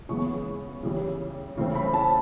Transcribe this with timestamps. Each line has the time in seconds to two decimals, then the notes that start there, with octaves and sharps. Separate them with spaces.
0.09 C#3 E3 G#3 B3 C#6
0.83 C#3 E3 G3
1.57 C#3 E3 A3 C4
1.75 B5
1.94 A5